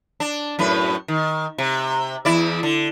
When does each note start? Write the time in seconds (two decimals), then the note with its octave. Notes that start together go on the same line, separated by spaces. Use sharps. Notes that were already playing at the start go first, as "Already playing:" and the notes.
0.20 D4
0.59 F#2 A2 B4
1.08 D#3
1.58 C3
2.25 E2 E4 D5
2.63 D3